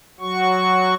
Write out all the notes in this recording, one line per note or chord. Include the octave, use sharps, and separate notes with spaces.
F#3 F#4 C#6